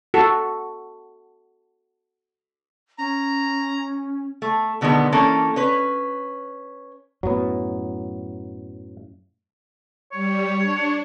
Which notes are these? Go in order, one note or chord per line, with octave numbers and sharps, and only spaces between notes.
F#4 A4
C#4 A#5
A3
B2 D3 D#3 G#3 B3
E3 A#3 C#4 A4
C#4 B4
F#2 A2 F#3 B3
G3 C#5
D4